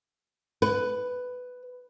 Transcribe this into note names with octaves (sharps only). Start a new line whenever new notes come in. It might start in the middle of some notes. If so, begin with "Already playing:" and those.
B4